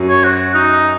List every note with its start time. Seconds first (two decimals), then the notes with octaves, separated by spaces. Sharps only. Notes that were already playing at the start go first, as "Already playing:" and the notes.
Already playing: F#2 F#3
0.09 C#5
0.24 F#4
0.55 D#4